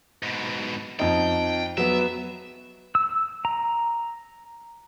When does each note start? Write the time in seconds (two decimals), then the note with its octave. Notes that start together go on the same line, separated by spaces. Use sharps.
0.23 G#2 B2
1.00 F2 D#4 G5
1.78 F#3 B3 E5
2.95 E6
3.45 A#5